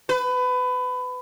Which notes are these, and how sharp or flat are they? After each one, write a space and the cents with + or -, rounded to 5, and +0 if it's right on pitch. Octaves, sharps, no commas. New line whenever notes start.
B4 +25